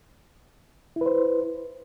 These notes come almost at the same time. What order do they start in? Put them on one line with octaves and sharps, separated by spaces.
E4 B4 C5